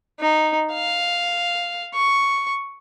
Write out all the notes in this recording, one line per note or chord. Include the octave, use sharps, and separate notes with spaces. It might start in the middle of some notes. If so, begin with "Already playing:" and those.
D#4
F5
C#6